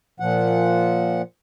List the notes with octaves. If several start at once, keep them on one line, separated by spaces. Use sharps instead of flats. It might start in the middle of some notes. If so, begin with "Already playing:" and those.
A#2 F3 F#5